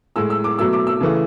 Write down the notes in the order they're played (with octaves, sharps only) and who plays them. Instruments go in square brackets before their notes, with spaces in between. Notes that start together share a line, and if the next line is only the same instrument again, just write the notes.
[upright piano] A2 G#3 E6
E6
D6
B2 F#3 A3 E6
D6
E6
C#3 E3 A3